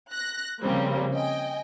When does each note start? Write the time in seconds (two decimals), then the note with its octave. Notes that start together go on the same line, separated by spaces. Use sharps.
0.11 F#6 A#6
0.61 C#3 F3 G3 A#3 C4
1.13 D#5 G5 G#5